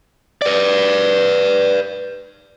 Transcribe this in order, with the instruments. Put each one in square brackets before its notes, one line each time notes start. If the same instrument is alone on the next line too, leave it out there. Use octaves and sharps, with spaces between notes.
[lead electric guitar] B4 D5